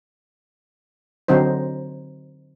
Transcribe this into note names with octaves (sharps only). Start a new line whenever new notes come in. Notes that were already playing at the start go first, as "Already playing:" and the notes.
D3 F#3 C4 D#4 C5